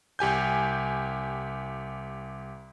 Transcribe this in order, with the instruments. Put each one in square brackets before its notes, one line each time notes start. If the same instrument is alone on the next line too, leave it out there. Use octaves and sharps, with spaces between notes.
[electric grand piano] C2 G4 G#5 G6